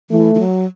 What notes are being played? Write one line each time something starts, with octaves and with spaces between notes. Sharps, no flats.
E3 A3
E3
F#3